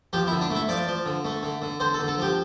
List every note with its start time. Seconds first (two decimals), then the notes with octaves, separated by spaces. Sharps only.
0.13 F3 G4
0.27 E4
0.32 D3
0.41 D4
0.50 A3
0.55 E4
0.69 F3 D5
0.87 F3
1.06 D3
1.25 A3
1.43 D3
1.62 D3
1.80 D3 C5
1.94 A4
1.99 D3
2.08 A4
2.18 F3 G4